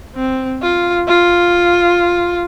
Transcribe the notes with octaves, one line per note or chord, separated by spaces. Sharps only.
C4
F4
F4